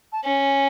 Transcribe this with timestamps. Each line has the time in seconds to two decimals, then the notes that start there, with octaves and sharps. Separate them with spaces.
0.12 A5
0.24 C#4 G#5